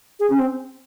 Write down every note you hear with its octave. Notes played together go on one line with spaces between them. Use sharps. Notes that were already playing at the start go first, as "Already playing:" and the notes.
G#4
C#4
C4